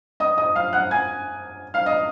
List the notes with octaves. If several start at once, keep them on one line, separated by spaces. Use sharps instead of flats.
D#5 D#6
D#5 D#6
F5 F6
F#5 F#6
G#5 G#6
F5 F6
D#5 D#6